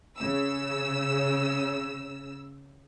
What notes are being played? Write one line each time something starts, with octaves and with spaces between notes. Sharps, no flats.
C#3 E6